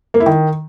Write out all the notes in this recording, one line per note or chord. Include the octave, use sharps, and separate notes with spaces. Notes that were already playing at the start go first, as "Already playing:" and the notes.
A#3
E4
D#3